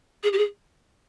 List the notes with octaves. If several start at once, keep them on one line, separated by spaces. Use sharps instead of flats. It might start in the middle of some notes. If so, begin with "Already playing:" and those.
G#4
G4
G#4